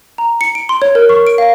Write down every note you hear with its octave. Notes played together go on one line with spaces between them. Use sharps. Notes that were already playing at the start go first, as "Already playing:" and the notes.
A#5
C#7
D7
C6
C#5
A#4
C#6
D7
F5